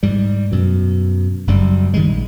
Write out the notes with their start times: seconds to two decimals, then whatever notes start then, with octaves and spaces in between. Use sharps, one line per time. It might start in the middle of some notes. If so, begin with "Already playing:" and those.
0.03 G#2 G3
0.52 F#2 B2
1.47 F#1 F#2 G3
1.94 A2 D#3 G3 G#3
2.06 A#1